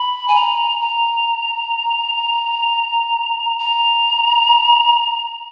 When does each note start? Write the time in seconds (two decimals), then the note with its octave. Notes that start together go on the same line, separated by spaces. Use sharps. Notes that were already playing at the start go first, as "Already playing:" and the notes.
Already playing: B5
0.28 G#5
0.35 A#5
0.81 A#5
3.59 A#5